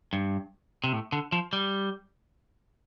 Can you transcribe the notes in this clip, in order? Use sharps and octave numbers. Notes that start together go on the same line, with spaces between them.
G2
C3
A2
D3
F3
G3